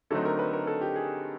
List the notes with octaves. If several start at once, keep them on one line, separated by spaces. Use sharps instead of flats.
D3 F#3 A3 C4 D#4 A4
A#4
B4
A#4
A4
G4
G#4